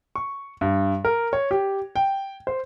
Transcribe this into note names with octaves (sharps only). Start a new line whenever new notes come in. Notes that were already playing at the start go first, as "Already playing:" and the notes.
C#6
G2
A#4
C#5
G4
G5
C5